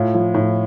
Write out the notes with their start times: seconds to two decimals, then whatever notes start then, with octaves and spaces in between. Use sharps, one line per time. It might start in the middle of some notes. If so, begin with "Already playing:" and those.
Already playing: A2 F4
0.14 F3
0.34 A2